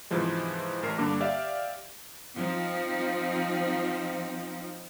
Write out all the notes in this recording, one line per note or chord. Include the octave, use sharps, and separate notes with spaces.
G#2 C3 E3 F3 G#3
A1 A#4 C7
G2 D3 A#3 D6
G4 D5 E5 F5
F3 C4 D#4